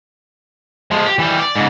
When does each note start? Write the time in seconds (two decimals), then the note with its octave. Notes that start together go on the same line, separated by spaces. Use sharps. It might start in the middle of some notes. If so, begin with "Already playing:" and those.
0.91 F3 G#3
1.06 G4
1.19 E3 G3
1.39 D5
1.56 G#2 C#3